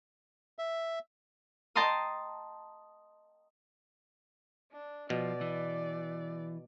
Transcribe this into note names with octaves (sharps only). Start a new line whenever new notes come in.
E5
D#5 G5 A5 A#5 C6 D#6
D4
B2 F3 D5
E3